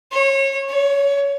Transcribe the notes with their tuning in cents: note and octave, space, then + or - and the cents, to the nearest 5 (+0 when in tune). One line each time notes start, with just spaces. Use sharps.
C#5 -25
C#5 +20